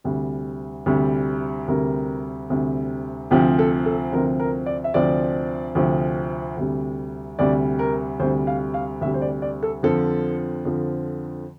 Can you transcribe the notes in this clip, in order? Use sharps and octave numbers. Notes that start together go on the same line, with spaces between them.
D2 C3 G3
D2 C3 G3
D2 C3 G3 A#4
D2 C3 G3
D2 C3 F3 C4 G4
A4
A4
D2 C3 F3 C4 A#4
A#4
D5
E5
D2 C3 F3 C4 D5
D2 C3 F3 C4
D2 C3 G3
D2 C3 G3 D5
A#4
D2 C3 G3 C5
F5
F5
D2 C3 G3 E5
C5
D5
D5
A4
F2 D3 F3 A4
F2 D3 F3